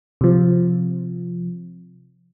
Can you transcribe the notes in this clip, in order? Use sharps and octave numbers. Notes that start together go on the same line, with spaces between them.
C3 F3